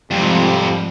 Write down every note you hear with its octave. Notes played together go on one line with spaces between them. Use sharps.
F2 G#2 C3 F3 G3